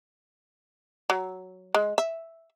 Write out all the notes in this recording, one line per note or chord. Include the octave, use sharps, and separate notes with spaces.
F#3
G#3
E5